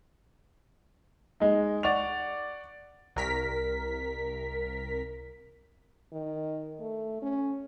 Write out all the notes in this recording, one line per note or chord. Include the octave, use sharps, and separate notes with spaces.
G#3 D#4
D5 F#5 C#6 F7
C2 A#4 B6
D#3
A3
C#4